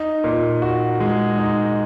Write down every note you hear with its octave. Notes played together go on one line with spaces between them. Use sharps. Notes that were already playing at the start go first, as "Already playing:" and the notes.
Already playing: D#4
A#2
F#4
G#3
D#4